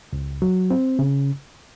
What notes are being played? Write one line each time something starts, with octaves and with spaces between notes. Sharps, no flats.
C#2
F#3
C4
C#3